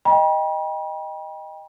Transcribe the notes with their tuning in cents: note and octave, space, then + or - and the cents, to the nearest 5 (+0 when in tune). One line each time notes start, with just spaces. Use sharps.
D#5 +0 G5 +20 B5 -45